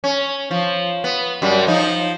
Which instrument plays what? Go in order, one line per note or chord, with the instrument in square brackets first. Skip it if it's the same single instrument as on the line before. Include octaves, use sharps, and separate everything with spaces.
[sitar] C#4
F3
B3
F#2 G3
F3 D#4